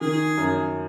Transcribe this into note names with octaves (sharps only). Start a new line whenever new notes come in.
D#3 G#4
F#2